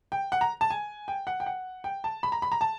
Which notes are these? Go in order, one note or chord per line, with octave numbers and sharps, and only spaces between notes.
G5
F#5
A#5
A5
G#5
G5
F#5
G5
F#5
G5
A5
B5
A#5
B5
A#5
A5